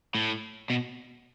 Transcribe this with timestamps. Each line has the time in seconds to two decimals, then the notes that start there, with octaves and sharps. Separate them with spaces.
0.15 A2
0.70 B2